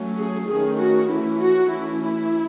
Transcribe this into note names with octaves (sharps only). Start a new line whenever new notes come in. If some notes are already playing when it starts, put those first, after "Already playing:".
Already playing: F#3 A3 C#4
G#4
D#3 A3 C#4 G#4
F#4
E3 A3 C#4 E4
F#4
E3 A3 C#4 E4
E4